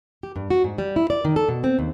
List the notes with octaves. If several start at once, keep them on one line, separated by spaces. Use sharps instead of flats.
G4
G2
F#4
G#2
G3
E4
D5
D#3
A4
B2
C4
D#2